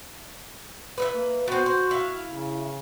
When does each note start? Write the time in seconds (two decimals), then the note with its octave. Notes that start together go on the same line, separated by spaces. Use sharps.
0.98 B4 D#5 E5
1.15 A#3
1.48 B3 C4 F#4
1.66 C5
1.91 E4 F5
2.28 C#3